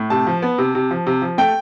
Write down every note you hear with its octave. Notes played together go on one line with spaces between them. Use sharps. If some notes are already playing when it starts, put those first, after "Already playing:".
Already playing: A2
C3 A5
F3
B3
C3
C3
F3
C3
F3
A3 G5